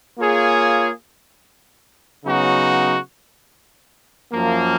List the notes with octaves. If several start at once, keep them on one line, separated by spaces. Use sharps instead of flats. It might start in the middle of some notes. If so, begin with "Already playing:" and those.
A#3 F4 G#4 C#5
C#3 F#3 B3 D#4 F#4
F#2 F3 A#3